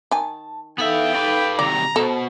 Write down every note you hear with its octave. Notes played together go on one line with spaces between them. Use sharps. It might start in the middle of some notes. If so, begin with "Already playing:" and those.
D#3 G#5 A5
B3 D#4 A4 E5 F5 G5
B4 D5
C3 D#3 D5 A#5
B2 A4 C5 A5